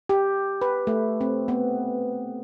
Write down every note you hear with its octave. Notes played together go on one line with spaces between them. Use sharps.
G4
B4
A3
C4
B3